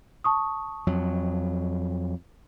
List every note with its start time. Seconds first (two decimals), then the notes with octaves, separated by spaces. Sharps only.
0.24 A5 C#6 D#6
0.87 F2 F#3